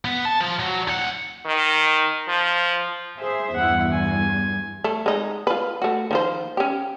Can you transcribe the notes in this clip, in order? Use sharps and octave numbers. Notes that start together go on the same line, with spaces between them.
B3
A5
F3
F#3
D#2 F#5
D#3
F3
G#4 C5 E5
E2 G2 E4 F#5
G#5
A3
G#3 D#4
F4 B4
A3 F#4
D#3 F3 C5
C#4 G4